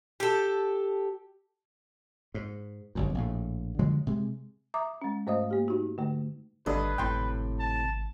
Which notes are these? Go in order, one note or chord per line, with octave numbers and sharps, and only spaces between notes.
G4 A4
G#2
G1 C2 F#2
A#1 A2
D3 F3 F#3 G#3
C3 G#3
E5 A#5 D6 D#6
G#3 C#4
G#2 A3 C5 D#5 F5 D#6
A#3 G4
D#4 F#4
D3 A3
G#1 G2 D3 A4 B4 D#5
G#1 A2 C3 G5 C6
A5